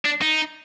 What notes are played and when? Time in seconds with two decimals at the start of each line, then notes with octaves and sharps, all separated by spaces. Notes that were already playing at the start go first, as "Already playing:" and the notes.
0.05 D4
0.22 D#4